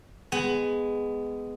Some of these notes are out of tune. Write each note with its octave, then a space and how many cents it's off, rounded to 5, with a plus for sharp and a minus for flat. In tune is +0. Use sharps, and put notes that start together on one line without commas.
G#3 +0 B3 +15